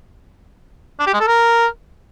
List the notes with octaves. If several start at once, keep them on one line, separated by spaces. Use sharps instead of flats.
D4
G4
G#3
A4
A#4